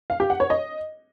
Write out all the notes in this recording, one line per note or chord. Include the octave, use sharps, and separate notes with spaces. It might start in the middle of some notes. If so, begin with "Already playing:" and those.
F5
G4
F#5
C#5
D#5